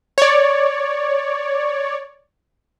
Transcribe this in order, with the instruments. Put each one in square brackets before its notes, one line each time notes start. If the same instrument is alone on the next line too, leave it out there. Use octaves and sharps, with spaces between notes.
[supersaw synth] C#5 D5